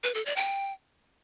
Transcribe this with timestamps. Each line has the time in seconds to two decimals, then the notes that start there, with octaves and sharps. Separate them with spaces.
0.04 B4
0.15 A4
0.25 D5
0.36 G5